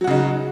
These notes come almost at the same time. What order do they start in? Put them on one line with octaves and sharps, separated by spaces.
F#3 F#4 C#3 D#4